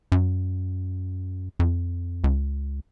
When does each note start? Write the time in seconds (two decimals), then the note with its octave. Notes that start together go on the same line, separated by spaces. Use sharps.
0.12 F#2
1.59 F2
2.24 C#2